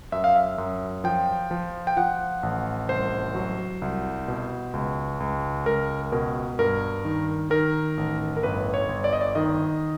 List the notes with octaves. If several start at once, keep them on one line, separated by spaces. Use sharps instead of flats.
F#2 E5
F5
E5
F#2
F3 G5
F3
G5
F3 F#5
A1
C2 C5
F#3
C2
B2
C#2
C#2
C#2 A#4
B2 A#4
G2 A#4
D#3
D#3 A#4
A1
A#4
G1 B4
C#5
G1
D5
D#5
D5
D#3 D#5